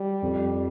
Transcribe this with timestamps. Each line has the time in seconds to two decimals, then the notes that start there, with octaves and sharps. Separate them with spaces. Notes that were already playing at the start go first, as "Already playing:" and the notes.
Already playing: G3
0.22 F2